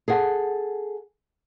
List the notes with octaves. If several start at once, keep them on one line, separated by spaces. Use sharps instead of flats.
G#4 A4 F#5